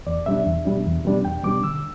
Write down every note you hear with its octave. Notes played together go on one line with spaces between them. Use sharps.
E2 D5
B2 G3 D4 E5
E2
B2 G3 D4
E2
B2 G3 D4
E2 G5
B2 G3 D4 D6
D3 E6